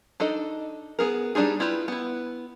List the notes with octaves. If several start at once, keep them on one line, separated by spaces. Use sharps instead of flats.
D4 D#4 A4 D#5
B3 G#4 A#4
G3 D4 D#4 F4 G#4
E4 F4 G4 B4
B3 E4